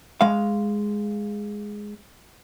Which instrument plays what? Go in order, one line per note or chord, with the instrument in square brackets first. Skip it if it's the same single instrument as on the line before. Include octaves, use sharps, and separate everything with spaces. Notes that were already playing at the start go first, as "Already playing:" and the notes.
[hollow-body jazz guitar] G#3 F5